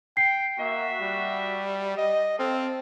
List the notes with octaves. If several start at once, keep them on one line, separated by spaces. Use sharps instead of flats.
G5 C7
A#3 F#4 E5
G3
D#5
C4 A4 F5